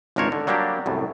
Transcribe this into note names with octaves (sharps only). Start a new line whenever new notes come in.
G#1 C#2 D4 A#4 C5 C#5
D3
F#3 G3 A#3 D4 G4
C2 F#2 A2